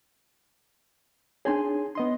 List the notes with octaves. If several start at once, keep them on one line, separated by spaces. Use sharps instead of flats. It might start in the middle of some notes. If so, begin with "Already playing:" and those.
D4 D#4 G#4 C#5 G#5 C6
B3 D#5 C6